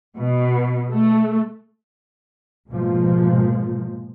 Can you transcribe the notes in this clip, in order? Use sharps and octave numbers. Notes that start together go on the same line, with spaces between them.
B2
A3
C2 G#2 B2 F3 G#3 A#3